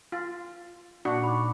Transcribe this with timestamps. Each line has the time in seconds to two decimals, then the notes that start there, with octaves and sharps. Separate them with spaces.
0.12 F4 A6
1.05 A#2 A#3 D4 F#4 C#6
1.23 D#4 B5 C#6 D6